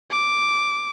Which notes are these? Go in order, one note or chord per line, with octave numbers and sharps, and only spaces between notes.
D6